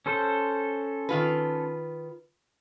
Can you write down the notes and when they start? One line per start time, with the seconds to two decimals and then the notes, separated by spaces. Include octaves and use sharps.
0.06 C#4 A4 C5
1.09 D#3 F4 B4